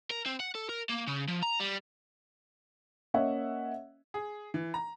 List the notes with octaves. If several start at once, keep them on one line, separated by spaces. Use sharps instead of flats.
A#4
C4
F#5
A4
A#4
A#3
C#3
F3
A#5
G3
A#3 C#4 C#5 D#5 E5 F#5
G#4
E3
A#5